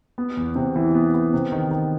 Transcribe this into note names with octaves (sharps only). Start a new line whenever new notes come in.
B3
E2
C3
E3
B3
B3
C3
D#3
D#3